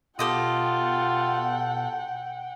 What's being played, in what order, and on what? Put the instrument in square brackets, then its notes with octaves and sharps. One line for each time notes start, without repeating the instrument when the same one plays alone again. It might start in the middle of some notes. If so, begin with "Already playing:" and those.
[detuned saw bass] B2 [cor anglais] F4 [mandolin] G4 A4 D#5 [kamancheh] F#5 G5